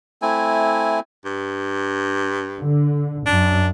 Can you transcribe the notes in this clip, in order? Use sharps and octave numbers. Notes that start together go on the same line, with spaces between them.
A3 C4 E4 G#5
G2
D3
F#2 D4